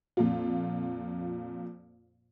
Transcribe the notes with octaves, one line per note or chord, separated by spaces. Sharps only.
F2 A#2 F4